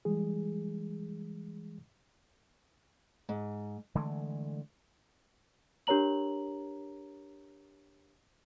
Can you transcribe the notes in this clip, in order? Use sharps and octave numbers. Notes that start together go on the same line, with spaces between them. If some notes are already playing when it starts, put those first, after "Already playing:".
E3 G3 G#3 G#4
G#2
D3 E3 G#3 A3
D4 G4 A#4 C#5 A#5 F#7